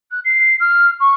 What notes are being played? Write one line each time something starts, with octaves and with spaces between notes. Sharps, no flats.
F#6
C7
F6
C#6